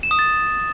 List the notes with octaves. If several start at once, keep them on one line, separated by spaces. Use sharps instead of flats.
E7
D#6
A6